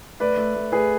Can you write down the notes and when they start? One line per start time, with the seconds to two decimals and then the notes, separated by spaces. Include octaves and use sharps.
0.20 A3 B4 D5
0.37 A3
0.55 A3
0.72 A3 G#4 B4